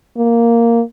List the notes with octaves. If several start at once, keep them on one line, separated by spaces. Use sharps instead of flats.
A#3